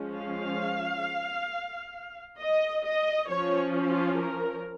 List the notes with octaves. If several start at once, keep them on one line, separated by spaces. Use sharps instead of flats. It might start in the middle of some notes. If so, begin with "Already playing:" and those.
Already playing: F3 G#3 C#4
F5
D#5
D#5
F3 C#4 C#5
F4
A#4